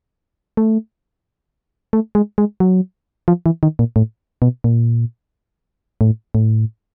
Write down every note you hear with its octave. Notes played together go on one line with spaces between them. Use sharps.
A3
A3
G#3
G#3
F#3
F3
E3
D#3
A#2
A2
B2
A#2
A2
A2